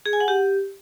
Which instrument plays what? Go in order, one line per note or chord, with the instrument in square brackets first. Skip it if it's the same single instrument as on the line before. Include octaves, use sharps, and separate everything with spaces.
[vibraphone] G#4
G#5
F#5
G4